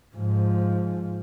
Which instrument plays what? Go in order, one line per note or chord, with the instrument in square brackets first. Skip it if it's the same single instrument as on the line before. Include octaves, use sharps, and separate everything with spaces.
[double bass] G#2 F3